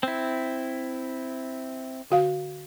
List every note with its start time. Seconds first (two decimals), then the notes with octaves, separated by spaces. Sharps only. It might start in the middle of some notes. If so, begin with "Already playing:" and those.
0.03 C4 E4
2.11 D3 F#4 F5